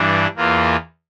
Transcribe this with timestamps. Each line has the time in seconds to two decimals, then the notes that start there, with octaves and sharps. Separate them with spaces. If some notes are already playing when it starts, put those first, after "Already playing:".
Already playing: G2 E3 G3 D4
0.37 E2 E3 A#3 F4